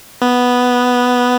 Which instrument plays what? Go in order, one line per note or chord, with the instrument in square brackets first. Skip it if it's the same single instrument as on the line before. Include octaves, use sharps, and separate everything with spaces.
[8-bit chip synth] B3